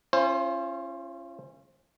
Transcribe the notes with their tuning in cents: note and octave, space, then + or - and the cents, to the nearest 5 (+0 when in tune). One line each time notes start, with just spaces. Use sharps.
C#4 -20 F4 -40 C5 +20